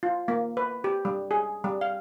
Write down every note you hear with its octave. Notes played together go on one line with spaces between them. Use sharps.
F4
A#3
B4
G4
G3
G#4
G3
F5